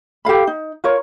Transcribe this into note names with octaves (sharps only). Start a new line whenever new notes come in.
G4 A4 F5 B5
D#4
F4 A#4 C#5